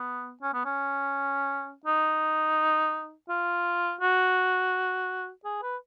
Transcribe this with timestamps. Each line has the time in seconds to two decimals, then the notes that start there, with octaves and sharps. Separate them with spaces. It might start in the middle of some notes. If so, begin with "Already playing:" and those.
Already playing: B3
0.42 C#4
0.53 B3
0.65 C#4
1.85 D#4
3.29 F4
4.01 F#4
5.44 G#4
5.62 B4